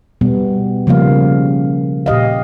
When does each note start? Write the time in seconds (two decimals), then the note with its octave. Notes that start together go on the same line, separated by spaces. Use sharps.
0.21 B2 G3 B3
0.87 C#3 F3 G3 A#3 F5
2.06 A#2 G4 D#5 F5